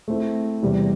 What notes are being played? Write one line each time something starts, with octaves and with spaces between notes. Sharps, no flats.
A3 C4 E4
E2 C3 G3